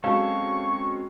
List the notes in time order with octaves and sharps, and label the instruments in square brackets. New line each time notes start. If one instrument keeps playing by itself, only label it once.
[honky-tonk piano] F#3 G#3 [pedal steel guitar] C4 C#4 A4 [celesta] F5 [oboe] C#6